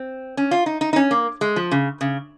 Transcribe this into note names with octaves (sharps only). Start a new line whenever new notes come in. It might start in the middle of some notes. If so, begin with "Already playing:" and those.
Already playing: C4
C#4
F4
D#4
D#4
D#4
C#4
A#3
G#3
F3
C#3
C#3